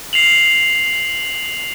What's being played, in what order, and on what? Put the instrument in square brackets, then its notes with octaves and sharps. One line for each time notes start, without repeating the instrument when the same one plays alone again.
[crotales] C7 F7 F#7